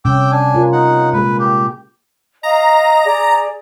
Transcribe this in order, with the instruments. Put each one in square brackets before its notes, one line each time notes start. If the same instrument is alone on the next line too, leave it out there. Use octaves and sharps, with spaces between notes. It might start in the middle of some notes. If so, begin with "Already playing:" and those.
[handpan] C3 G3 C#4 [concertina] G5 D6 E6
[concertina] D4 G#5
[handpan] F4 A#4
[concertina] D#4 F#5
[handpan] G#3 A#3 G#4 [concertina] B4
[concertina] G4
[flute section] D#5 F5 D#6 [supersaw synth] A#5
[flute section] G#4 D5